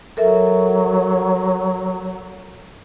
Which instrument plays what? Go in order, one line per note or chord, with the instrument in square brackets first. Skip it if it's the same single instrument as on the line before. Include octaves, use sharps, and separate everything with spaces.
[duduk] F#3 [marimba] A4 A#4 E5